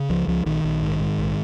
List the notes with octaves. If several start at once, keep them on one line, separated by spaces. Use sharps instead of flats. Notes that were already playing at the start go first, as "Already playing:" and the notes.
Already playing: C#3
C#2 F3
C#2 F3
A#1 D#3
A#1
G#2
G#2
A#1